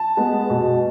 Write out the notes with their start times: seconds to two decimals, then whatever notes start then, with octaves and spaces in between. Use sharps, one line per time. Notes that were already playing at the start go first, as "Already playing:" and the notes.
Already playing: A5
0.17 G#3 B3
0.50 B2